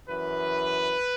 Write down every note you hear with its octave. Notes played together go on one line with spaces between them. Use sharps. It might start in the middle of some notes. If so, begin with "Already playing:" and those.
F#2 E3 B4